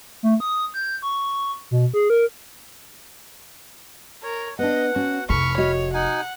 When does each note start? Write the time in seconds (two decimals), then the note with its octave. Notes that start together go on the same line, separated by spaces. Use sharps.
0.23 A3
0.40 D#6
0.74 G6
1.02 C#6
1.71 B2
1.94 G#4
2.10 A#4
4.23 A#4 C#5
4.59 B3 D4 D#5 F#5
4.96 C#4 F#4
5.29 F1 E4 A4 B5 C#6 F6
5.58 F#4 C#5 D#5
5.94 D#4 F#5 G#5